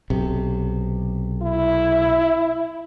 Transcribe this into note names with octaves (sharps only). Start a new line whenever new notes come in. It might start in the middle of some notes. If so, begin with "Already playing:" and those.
B1 C3
E4